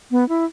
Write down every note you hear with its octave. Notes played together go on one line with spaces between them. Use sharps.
B3
E4